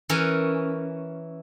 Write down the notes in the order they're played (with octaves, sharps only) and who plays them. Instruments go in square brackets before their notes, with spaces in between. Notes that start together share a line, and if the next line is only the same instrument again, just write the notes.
[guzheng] E3 C#4 A#4